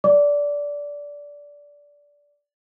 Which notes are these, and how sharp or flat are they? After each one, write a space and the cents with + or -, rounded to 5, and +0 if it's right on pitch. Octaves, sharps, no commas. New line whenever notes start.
D5 -15 D6 -20